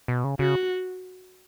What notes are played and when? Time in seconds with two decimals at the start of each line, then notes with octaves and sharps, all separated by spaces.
0.08 B2
0.24 C#3
0.39 C#3 F#4